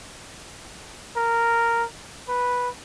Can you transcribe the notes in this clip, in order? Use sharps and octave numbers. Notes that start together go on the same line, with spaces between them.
A#4
B4